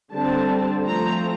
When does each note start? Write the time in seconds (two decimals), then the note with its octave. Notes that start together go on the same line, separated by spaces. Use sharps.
0.12 D3 G3 C4 A5
0.85 F3 A3 C4 A#5